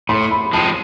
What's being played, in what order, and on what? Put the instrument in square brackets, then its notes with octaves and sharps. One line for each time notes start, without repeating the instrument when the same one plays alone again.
[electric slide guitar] A2 [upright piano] C6
[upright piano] B5
[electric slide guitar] F3 G#3 C4 [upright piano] A5